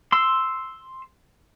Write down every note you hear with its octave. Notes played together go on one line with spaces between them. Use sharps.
C6 E6